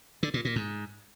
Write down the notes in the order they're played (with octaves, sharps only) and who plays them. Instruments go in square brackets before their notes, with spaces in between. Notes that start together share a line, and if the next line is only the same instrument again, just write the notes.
[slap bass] D3
A#2
A#2
G#2